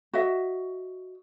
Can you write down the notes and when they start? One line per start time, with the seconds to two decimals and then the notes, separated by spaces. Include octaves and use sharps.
0.13 F#4 D#5 E5